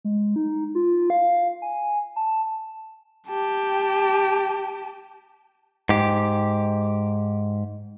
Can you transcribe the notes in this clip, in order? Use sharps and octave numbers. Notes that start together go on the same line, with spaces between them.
G#3
D#4
F4
F5
G#5
A5
G4 A5
G#2 G4